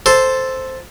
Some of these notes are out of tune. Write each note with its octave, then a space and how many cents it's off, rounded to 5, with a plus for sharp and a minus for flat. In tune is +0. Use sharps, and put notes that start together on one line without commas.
A4 +0 C5 +0